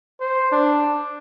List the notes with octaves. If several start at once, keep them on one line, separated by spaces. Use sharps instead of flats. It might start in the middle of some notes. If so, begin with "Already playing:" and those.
C5
D4